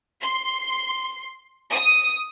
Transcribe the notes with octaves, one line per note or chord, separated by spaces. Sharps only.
C6
D#6